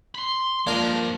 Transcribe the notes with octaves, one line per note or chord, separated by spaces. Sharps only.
B5 C6
F3 G#3 A#3 D4 A#4
G2